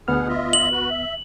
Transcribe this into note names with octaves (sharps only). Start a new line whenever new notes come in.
D2 B2 B3 G#4 F#5 F6
F4 D#5 E5
F#7
F#4 B4
E5